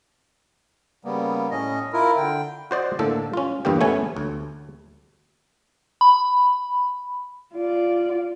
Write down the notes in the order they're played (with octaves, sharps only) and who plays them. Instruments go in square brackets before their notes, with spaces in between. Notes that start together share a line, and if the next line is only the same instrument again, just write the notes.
[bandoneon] C#3 G3 A#3 B3
A2 C#4 D#5
E4 F4 A#4
D3 G5
[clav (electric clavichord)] F#4 C5 D5 D#5
A2 D3 A#3 A4
C#4 F4
E2 G2 A#3 G4
A3 B3 C#4 G#5
D2
[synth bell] B5
[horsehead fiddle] F4 D5